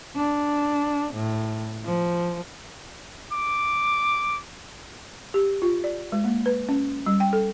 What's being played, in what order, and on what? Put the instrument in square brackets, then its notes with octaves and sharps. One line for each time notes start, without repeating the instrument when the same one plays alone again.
[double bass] D4
A2
F3
[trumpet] D6
[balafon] G4
F4
D5
G#3
A#3
B4
C#4
G3
G5
A4